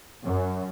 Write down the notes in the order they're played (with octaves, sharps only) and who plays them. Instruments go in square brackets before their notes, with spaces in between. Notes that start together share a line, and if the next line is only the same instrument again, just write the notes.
[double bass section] F#2